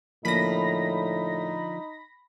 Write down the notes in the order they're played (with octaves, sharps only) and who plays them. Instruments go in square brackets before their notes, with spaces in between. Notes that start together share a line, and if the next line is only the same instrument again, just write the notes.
[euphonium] A2 [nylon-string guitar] D3 F3 A#3 [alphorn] D#4 [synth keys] B5 A#6